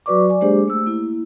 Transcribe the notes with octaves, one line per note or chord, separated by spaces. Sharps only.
F#3 F#4 B4 D5 C#6 D6
D5 G#5 D6
G#3 A#3 D4 G4 G#4 C5
A3 E6
A#3 E4